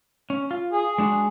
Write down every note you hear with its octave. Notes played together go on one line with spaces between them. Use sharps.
C#4
F4
G#4
G#3 D4 F#4